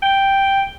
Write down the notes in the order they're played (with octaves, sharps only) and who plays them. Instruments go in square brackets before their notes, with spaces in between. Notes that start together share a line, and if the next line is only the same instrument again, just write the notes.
[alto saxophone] G5